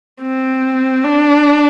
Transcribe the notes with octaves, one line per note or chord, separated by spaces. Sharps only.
C4
D4